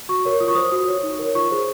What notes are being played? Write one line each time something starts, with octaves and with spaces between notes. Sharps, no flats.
F#4 C#6
A#4 C#5
F4 D#6
C#6
C5 D#6
F#4 D#6
C#5
D#4
A#4 C#5
F4 C#6
G#4 C5